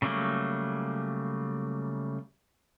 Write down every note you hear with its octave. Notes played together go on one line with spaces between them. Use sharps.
C#3 F#3 G3 A3 A#3